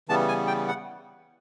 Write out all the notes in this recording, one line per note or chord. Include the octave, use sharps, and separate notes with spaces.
C#3 E3 G3 B3 A5
G#5
G5
F#5